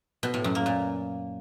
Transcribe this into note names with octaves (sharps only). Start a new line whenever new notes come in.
B2
A2
F#2
A#3
A#2